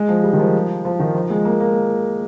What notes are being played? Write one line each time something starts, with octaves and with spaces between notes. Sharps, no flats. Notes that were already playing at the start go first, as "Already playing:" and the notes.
Already playing: G#3
F3
G3
D#3
F3
F3
D#3
F3
G#3
A#3
A#3